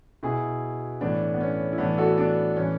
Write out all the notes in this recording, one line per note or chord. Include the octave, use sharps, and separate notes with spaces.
B2 E4 G#4
A2 E3 B3 D4
B3
C#4
E4
A2 E3 B3 D4
F#4 A4
B3 D4
A2 E3 C#4